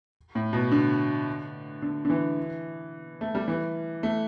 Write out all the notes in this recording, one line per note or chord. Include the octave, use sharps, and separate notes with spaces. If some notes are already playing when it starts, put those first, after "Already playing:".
A2
B2
D3
D3
D3
E3
A3
G3
E3
A3